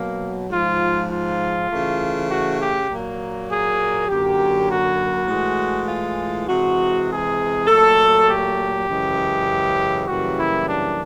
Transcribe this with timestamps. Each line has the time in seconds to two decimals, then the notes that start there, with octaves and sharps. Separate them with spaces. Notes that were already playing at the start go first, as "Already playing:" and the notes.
Already playing: B2 F#3 A#3
0.49 G#2 F3 G#3 F4
1.09 F4
1.70 C#3 E3 A3
2.29 F#4
2.59 G4
2.89 A#2 F#3 A#3
3.49 G#4
4.08 F#2 D3 F#3 A#3 G4
4.68 F#4
5.28 A2 E3 G#3
5.88 F4
6.48 C3 E3 G#3 F#4
7.08 G#4
7.67 A#2 F#3 A3 A4
8.28 G4
8.88 F#2 C#3 E3 G#3
10.07 F#2 C#3 E3 G3 A#3 F#4
10.36 E4
10.66 D4